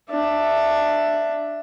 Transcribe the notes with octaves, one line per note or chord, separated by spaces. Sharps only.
D4 E5